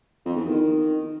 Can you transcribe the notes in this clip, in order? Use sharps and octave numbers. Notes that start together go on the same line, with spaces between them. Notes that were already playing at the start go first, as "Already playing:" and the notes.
F2
E2
D#3